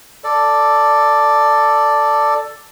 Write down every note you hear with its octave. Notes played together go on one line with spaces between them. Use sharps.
A4 D5